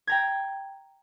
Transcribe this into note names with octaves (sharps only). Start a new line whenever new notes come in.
G5 A#5 G#6